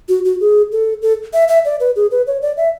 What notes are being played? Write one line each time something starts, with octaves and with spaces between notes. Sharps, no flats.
F#4
F#4
G#4
A4
A4
E5
E5
D5
B4
G#4
B4
C#5
D5
E5